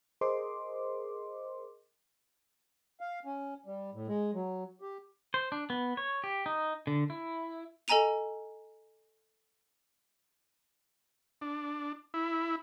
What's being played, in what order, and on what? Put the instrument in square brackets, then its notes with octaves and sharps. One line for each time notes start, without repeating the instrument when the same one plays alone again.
[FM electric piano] G#4 A#4 C5 D#5 C6 D6
[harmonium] F5
C#4
G3
A2
G#3
F#3
G4
[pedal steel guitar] C5
D4
B3
C#5
G4
D#4
D3
E4
[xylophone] A4 D#5 G#5 A#5 D#7 F7
[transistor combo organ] D4
E4